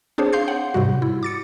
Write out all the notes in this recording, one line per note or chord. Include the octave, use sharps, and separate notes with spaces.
C4 D4 G#4 C5 C#5
F5 C6 G6 C7
F#5
G#2 C3 G3 F#4
E4
D6 A6 C#7